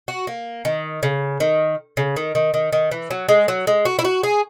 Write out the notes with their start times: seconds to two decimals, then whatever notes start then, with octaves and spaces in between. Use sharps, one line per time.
0.08 F#4
0.27 A#3
0.65 D#3
1.03 C#3
1.40 D#3
1.97 C#3
2.16 D#3
2.35 D#3
2.54 D#3
2.72 D#3
2.91 E3
3.11 F#3
3.29 G#3
3.48 F#3
3.67 G#3
3.85 F#4
3.99 E4
4.05 F#4
4.23 G#4